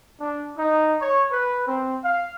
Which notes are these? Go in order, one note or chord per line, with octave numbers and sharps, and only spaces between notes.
D4
D#4
C#5
B4
C4
F5